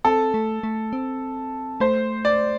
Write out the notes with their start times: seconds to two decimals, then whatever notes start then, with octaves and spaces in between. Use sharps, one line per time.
0.05 C4 A4
0.34 A3
0.63 A3
0.93 C4
1.80 A3 C5
2.25 D5